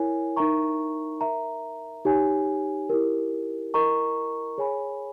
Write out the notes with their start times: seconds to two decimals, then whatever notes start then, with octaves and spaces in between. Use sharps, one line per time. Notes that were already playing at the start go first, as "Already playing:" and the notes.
Already playing: E4 A#4 C#5 G#5
0.37 D#4 A#4 E5 A#5 C#6
1.21 A#4 E5 A#5
2.05 D#4 G4 C#5 G#5
2.89 E4 G4 A#4
3.74 E4 A#4 D#5 A#5 C#6
4.58 G#4 C#5 G#5 B5